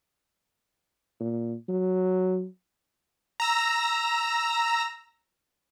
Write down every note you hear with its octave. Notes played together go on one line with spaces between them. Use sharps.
A#2
F#3
A#5 E6 A#6